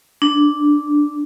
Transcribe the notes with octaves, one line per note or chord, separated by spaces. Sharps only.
D4